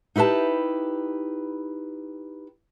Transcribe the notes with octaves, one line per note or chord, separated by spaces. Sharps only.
D#4 E4 G4 B4 A5